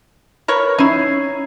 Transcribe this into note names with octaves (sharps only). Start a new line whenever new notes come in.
A#4 B4 C#5
C#4 D#4 E4 G#6 C7